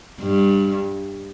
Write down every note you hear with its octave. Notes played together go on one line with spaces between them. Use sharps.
G2